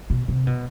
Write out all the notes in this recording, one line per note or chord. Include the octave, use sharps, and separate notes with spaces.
B2
C3
B2